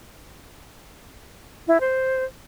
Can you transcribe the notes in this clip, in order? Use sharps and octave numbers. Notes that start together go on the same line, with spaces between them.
E4
C5